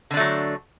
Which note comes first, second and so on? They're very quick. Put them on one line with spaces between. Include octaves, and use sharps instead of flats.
D3 D4 A3 F#3